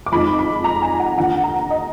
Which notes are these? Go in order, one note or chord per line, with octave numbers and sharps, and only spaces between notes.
D6
F2 F3 G#3 D#4 B5
B5
A#5
G#5
F#5
D#2 D3 F3 F#5
A#5
D#5